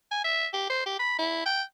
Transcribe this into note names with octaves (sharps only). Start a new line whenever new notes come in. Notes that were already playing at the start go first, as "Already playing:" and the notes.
G#5
E5
G4
C5
G4
B5
E4
G5